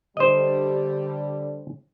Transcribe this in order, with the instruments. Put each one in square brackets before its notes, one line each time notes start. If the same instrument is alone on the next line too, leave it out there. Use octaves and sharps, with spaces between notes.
[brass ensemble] D3 G3 [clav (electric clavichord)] C5 D#5